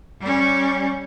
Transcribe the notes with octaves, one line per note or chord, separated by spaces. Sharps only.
G3 C#4